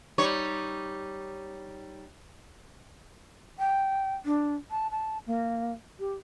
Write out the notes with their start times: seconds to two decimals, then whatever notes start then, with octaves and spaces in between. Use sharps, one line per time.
0.18 G3 D#4 C#5
3.59 G5
4.26 D4
4.71 A5
4.91 A5
5.27 A#3
5.99 G4